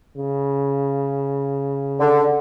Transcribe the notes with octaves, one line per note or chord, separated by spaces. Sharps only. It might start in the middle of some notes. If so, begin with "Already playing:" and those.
C#3
D3